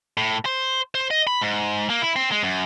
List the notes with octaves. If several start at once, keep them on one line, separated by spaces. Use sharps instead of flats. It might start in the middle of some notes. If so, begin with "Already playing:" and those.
A2
C5
C5
D#5
B5
G#2
A#3
E4
C4
G#3
F#2